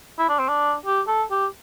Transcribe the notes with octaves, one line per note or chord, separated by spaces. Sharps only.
E4
D4
C4
D4
G4
A4
G4